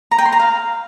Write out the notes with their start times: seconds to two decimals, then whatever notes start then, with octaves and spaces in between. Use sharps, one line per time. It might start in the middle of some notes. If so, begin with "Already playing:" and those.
0.11 A#5
0.18 G5
0.25 C6
0.32 A#5
0.39 F5